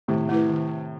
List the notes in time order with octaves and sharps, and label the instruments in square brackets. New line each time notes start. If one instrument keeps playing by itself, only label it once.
[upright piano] A2 C3 [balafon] D#3
[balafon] A3 E4 B4
D#3